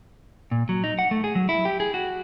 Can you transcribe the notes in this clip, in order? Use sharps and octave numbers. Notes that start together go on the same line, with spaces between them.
A#2
F#3
D#4
F#5
A3
G#4
F#3
E4
G4
G#4
F#4